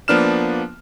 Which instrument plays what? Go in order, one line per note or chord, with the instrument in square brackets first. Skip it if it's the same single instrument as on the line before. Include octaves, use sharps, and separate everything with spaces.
[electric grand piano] F3 A#3 B3 D4 F6 E7